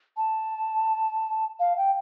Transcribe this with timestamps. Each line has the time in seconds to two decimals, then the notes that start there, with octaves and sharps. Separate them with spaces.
0.17 A5
1.59 F5
1.77 G5